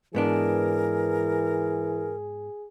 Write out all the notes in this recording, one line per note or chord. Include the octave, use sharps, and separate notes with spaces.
G#2 E3 B3 D4 G#4 A#4